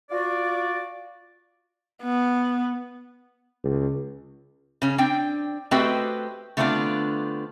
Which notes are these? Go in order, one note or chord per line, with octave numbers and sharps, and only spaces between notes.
F4 F#4 D5
B3
C#2
C#3 C#4
C4 D4 G5
A3 C4 F#4 G4 B4 D#5
D3 A3 B3 C4 D4 F4